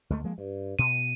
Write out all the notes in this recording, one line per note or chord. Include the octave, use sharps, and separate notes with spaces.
D2 G#3 A3
F3 G#3 A#3
G2
B2 D#7